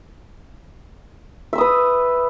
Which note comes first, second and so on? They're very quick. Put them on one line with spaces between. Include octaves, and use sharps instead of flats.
E5 E6 D#6 B4